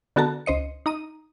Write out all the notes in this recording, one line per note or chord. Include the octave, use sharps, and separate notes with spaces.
D3 B3 F#4 A4 A5 A#5
C#2 C5 D#5 C#7
D#4 A#5 D#6 D#7